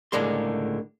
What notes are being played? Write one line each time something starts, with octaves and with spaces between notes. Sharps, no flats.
C#2 A2 D3 G#3 A#3 C6